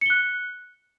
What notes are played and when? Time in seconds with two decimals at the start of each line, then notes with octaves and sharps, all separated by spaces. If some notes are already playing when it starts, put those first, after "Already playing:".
0.01 C#7
0.06 G7
0.10 F#6